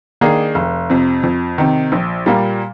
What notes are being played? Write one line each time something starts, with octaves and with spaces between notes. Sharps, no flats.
D#3 A#3 D4 G#4
F1
F2 C3
F2
C3 D#3
A#1
A#2 G3 A#3